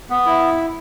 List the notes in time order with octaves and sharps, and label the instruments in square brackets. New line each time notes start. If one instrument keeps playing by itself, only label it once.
[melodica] B3
E4